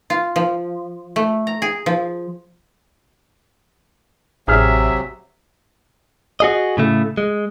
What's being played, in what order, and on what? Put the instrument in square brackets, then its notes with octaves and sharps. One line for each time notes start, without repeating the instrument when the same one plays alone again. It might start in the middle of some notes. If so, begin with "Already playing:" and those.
[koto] F4
F3
A3
A#5
G#4
F3
[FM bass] A1 [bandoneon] C3 F#3 [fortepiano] G#4 F6 [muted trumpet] E5
[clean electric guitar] F#4 G#4 D#5
A2 C#3 A3
G#3